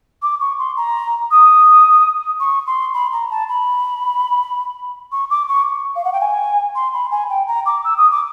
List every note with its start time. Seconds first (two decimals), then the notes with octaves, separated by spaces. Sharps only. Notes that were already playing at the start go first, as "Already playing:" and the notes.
0.23 D6
0.40 C#6
0.59 C6
0.77 A#5
1.31 D#6
2.40 C#6
2.67 C6
2.94 B5
3.12 A#5
3.31 A5
3.49 B5
5.12 C#6
5.30 D6
5.48 C#6
5.96 F5
6.04 F#5
6.13 G5
6.21 G#5
6.75 C6
6.94 B5
7.11 G#5
7.30 G5
7.48 A#5
7.66 D6
7.84 E6
7.97 D#6
8.11 D6